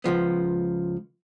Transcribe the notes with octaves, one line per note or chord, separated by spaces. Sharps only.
C#2 F#2 F3 B3